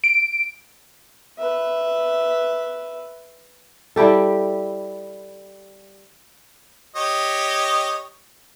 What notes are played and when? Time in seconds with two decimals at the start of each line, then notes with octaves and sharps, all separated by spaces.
0.04 D7
1.39 B4 E5
3.96 G3 E4 G4 A4
6.96 G4 C#5 D#5